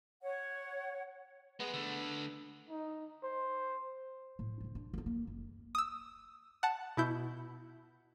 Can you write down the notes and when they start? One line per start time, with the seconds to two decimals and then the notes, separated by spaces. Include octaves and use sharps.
0.22 C#5 F#5
1.60 G#3 B3 G#4
1.74 D3 A3
2.69 D#4
3.23 C5
4.39 A2
4.60 D3 C#4
4.75 D4
4.94 A#3 B3
5.06 A#3
5.27 F#1
5.75 D#6 E6
6.63 F#5 A5
6.97 B2 E4 G6